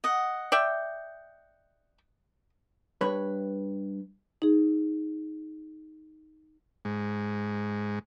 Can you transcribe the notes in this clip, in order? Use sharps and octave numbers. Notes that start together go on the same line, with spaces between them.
D#5 F#5
D5 E5 G5
G2 B4 C#5 B5
D#4 G#4
G#2